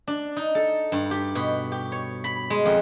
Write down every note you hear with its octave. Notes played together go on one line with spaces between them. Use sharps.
D4
D#4
A4
G2
G4
B2
G4
C#5
B5
G#3
F2